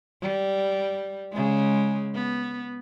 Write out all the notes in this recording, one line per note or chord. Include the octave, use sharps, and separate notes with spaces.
G3
C#3 G#3
B3